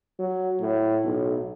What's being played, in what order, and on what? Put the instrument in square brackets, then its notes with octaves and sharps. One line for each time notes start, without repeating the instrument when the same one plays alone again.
[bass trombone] F#3
A2
B1